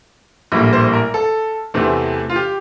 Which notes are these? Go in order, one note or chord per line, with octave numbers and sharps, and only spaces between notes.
A#1 A2 G3 A#3
C5
A#4
A4
E2 C3 E3 A3 C4
F4
G4